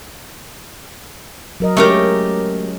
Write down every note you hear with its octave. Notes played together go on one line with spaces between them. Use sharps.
F#3 A#4 D#5
G#3 A3 C#4 G4 A#4